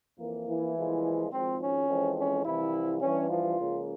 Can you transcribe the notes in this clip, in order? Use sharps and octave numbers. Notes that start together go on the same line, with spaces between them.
F2 E3 A#3
E3 E4
C2 A#2 F3 G#3
G#1 G#2 F3 C4
C#4
F2 E3 G#3 C4
C#4
C2 C3 E3 F3 E4
G2 E3 G3 C#4
F3 F4
C#2 C#3 F3 A#3